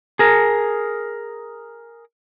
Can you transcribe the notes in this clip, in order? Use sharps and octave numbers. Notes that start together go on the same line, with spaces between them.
G#4 A#4